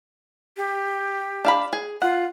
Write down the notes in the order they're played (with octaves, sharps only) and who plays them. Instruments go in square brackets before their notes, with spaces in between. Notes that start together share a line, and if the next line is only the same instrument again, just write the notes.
[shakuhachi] G4
[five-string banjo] D4 F5 B5
G#4
[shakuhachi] F4 [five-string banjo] F#5